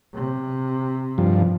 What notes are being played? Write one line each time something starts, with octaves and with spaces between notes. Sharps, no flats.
C3
G2 F3